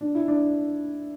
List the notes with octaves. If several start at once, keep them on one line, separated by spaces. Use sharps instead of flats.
D4
E4
D4